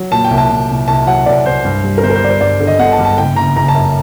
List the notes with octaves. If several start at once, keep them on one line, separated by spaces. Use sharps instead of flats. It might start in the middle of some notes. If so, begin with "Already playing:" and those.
Already playing: F#3
A#2 A5
G5
C2
A5
C2
C2
C2 A5
F#3 F#5
C2 D5
C2 C5
G2
G3
A#4
G1 C5
A#4
C5
G3 D5
C5
G2 D5
D3
D#5
G1 F#5
A5
G2
A5
F#1 G5
F#1 A#5
F#1 A#5
A5
F#2